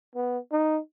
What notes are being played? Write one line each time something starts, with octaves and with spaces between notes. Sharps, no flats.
B3
D#4